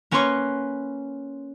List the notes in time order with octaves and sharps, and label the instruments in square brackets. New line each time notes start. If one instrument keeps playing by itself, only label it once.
[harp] A#3 C#4 B4 C#5 C6 C#6